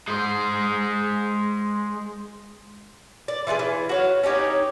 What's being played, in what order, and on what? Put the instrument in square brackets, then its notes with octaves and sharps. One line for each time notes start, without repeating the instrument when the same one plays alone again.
[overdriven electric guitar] G#3 C5
[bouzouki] D5
E3 F4 F#4 G#4
E3
F#4 C#5 F5
C#4 D#4 G4 C#5